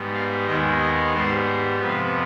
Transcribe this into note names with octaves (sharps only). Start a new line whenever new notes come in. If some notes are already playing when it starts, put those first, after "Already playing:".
Already playing: G#2 G3 B3
F5
D#2 D#3 G#3 B3 D#5
D#5
G#2 G3 B3 C5
F2 C3 F3 B3 B4